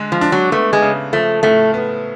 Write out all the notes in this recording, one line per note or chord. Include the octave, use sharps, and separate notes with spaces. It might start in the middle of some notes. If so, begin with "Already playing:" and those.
Already playing: D3 G#3
F3
D4
F#3
A3 B3
G#3
C#3
F3 A3
A2 A3
B3